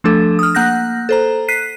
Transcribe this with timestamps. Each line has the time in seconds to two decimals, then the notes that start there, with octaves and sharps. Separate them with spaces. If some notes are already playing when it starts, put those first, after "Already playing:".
0.04 F3 A3 D4 A4
0.39 D#6 F6
0.55 A#3 F#5 F#6 G6 A#6
1.09 A4 C5 A#5
1.48 F#6 B6 C7 D#7